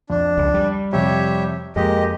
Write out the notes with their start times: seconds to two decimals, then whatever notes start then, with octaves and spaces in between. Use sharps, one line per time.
0.10 F2 D4
0.37 C#2
0.54 G3
0.93 F2 C3 G4 C#5 E5
1.76 F2 G#3 A#3 G4 D#5